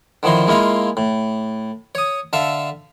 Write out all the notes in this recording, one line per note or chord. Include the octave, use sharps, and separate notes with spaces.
D3 D#3 F3 E4 C6
G#3 A#3 E4 F4 F5
A2
C#5 D#6
D3 A4 E5 F5